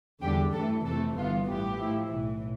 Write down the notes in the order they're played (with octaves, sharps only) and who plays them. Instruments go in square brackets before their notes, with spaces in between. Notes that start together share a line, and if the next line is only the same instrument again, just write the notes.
[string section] E2 D3 G3 D4 G4
G2 E3 A3 A4
F2 C3 E3 A3 A4
G1 G2 E3 B3 F4
A1 G2 E3 B3 G4
A2 F3 A3 E4
B1 A2 E3